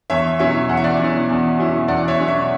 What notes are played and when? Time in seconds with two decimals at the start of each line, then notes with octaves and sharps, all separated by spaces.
0.10 E2 C#5 E5
0.39 B2 F#3 C#4 E4 C#5 E5
0.69 E2 F#5
0.77 E5
0.84 D5 F#5
0.99 B2 F#3 C#4 E4
1.29 E2
1.59 B2 F#3 C#4 E4
1.88 E2 D5 F#5
2.08 C#5 E5
2.18 B2 F#3 C#4 E4
2.28 C#5 E5